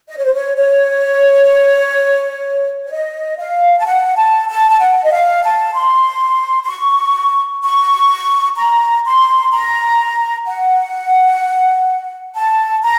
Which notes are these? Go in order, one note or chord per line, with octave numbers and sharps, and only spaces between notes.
D#5
C#5
C5
C#5
C#5
C#5
D#5
F5
A5
F#5
A5
A5
A5
F#5
D#5
F5
A5
C6
C6
C#6
C#6
A#5
C6
A#5
F#5
A5
A#5